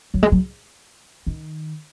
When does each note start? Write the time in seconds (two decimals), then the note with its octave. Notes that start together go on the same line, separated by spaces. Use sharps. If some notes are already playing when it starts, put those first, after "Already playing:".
0.14 F#3
0.23 G#3
0.32 F#3
1.27 D#3